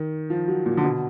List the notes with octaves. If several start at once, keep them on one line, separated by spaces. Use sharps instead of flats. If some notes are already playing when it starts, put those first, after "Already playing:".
Already playing: D#3
F3
F#3
A#2
D3
B2